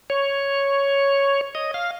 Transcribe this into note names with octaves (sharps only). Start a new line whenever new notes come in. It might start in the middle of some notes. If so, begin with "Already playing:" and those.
C#5
D#5
F5